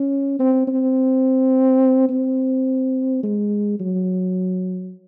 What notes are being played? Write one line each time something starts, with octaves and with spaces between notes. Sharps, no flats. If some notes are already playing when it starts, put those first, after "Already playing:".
Already playing: C#4
C4
C4
C4
G#3
F#3